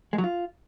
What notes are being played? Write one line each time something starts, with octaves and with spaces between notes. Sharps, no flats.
G#3
F#3
F4